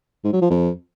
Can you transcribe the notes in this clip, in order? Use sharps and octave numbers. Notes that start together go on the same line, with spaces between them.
G#2
F#3
F3
F2